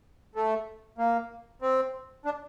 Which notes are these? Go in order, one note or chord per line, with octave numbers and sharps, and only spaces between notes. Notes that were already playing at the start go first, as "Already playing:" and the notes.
A3
A#3
C4
D4